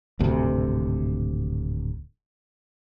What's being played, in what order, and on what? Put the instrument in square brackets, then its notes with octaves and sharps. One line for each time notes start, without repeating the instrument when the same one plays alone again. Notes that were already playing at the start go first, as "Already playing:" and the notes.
[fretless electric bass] D1 G#1 D2 C3